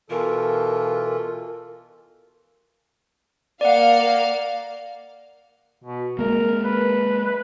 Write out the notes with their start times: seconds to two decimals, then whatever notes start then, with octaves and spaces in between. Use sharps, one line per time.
0.10 B2 E3 F4 A4 A#4
3.61 A#3 D5 F5 F#5
5.84 B2
6.19 G#3 A#3 A#4
6.65 B4